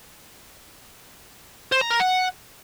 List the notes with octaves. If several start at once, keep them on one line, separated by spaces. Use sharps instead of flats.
C5
A#5
A#4
F#5